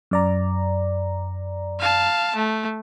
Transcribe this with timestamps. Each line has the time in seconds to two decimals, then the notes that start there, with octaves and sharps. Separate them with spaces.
0.11 F#2 D5 A#5
1.79 F5 A5
2.36 A3